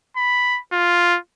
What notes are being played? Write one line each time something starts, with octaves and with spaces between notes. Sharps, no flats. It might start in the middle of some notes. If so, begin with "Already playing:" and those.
B5
F4